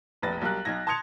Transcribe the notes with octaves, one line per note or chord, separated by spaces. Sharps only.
F1 A#1 B4 A6 A#6
B1 G3 A#4 F#6
B1 D#4 G#6 A#6
A5 C6 D#6 G#6 C#7 F7